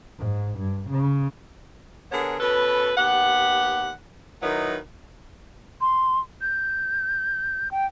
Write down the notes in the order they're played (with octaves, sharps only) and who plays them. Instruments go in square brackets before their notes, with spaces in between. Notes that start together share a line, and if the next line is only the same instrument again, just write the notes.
[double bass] G#2
G2
C#3
[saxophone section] D3 B3 G#4 A#4 C#5
B2 C#4 A4 B4
D#2 B3 G4 F#5
D#3 F#3 D#4 E4 B4
[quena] C6
G6
G5